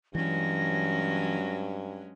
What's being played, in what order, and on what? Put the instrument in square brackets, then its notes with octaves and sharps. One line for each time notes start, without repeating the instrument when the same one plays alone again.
[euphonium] G2 [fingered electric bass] E3 [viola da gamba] F#3 G#3 C#4 [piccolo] A#6